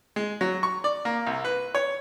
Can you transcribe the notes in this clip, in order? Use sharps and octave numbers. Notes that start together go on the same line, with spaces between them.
G#3
F#3
C#6
D5
A#3
C2
B4
C#5